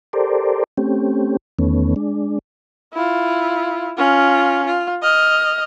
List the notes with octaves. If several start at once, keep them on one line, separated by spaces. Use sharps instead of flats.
G4 A4 A#4 C5 D5
A3 C4 C#4 G4
E2 D#3 A3 B3 C#4
G#3 D4
E4 F4
C#4 F4
F4
D#5 F6